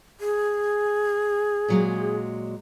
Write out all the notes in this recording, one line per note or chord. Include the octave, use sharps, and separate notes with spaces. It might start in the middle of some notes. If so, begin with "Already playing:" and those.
G#4
A#2 F#3 G#3